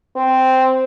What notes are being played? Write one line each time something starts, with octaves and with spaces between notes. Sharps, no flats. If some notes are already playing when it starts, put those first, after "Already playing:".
C4